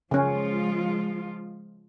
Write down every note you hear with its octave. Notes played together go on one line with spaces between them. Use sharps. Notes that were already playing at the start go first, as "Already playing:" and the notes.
C#3 F3 G#3 C#4 F4